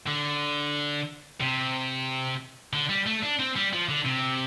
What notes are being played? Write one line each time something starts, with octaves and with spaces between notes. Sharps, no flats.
D3
C3
D3
G3
A3
D4
C4
G3
F3
D3
C3